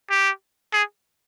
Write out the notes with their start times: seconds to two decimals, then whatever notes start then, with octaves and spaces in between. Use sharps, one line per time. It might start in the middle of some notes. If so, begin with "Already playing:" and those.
0.11 G4
0.73 G#4